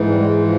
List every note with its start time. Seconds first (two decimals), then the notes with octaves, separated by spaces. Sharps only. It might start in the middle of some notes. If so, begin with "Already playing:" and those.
Already playing: G#2 E3
0.09 G3
0.17 G#3
0.42 F3